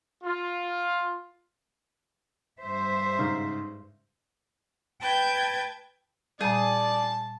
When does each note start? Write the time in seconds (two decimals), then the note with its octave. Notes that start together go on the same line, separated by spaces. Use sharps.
0.24 F4
2.60 G2 C5 E5
3.18 G#2 C#3 D#4
5.01 B4 G5 A5 G6 G#6
6.41 A#2 G3 G#4 D5 A5